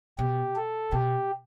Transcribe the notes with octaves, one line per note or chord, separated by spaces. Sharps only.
B2 G4
A4
B2 G4